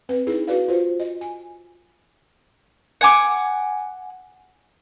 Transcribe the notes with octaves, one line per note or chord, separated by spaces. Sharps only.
C4 B4
D#4 E4 G#4
F#4 B4 D5 F5
F4 C5
D#5
G#5
F#5 G#5 D6